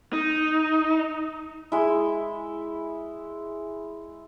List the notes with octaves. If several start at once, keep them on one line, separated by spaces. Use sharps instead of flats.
D#4
G#3 E4